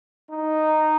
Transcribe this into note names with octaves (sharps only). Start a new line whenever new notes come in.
D#4